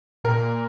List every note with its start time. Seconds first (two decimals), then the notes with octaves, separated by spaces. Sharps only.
0.24 A#2 A#4